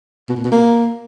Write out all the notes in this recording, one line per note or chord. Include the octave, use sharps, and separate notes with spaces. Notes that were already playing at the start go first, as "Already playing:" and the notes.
B2
A#2
B2
A#3